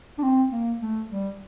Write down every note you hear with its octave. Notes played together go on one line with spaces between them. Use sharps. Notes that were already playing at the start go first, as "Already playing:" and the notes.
D4
C4
A#3
A3
G3